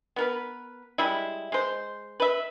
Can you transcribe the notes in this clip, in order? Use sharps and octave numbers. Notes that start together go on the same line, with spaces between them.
B3 A#4 B4
G3 G#3 E4
G#3 C5
B4 E5